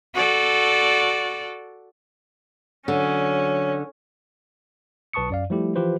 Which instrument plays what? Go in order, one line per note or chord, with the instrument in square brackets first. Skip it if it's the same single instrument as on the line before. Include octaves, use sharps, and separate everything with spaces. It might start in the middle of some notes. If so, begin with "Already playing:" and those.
[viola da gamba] F#4 A4 D5
[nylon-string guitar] D3 [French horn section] F#3 C#5 [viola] C#4
[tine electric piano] B1 B4 A5 C#6 D#6 C#7
F#2 D5 F5
F3 G3 A3 E4 G4
E3 F3 F4 G4 B4 C5